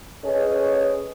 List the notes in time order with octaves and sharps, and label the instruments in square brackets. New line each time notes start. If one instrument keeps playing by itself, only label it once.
[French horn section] C#4 G#4 A4 B4 C#5 D#5